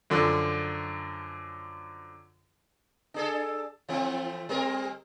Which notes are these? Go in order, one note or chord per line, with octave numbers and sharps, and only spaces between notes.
F#2 D3 F3
D4 G#4 A4
E3 A3 C4
G3 C4 A#4